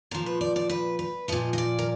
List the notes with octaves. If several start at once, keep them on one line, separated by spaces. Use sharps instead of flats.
A#2 F3 A#4
B4
D5
D5
B4
B4
A#2 F3 D#5
D#5
D5
A#4